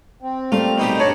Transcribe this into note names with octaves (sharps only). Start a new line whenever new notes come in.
C4
G3 A3 A#3 F4
B2 D#4 G4
G2 D4 C#5 A5 A#5